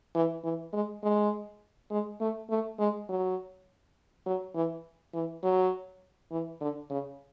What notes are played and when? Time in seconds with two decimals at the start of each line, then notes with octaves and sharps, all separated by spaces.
0.15 E3
0.44 E3
0.73 G#3
1.03 G#3
1.91 G#3
2.20 A3
2.50 A3
2.79 G#3
3.09 F#3
4.26 F#3
4.55 E3
5.14 E3
5.44 F#3
6.31 E3
6.61 D3
6.90 C#3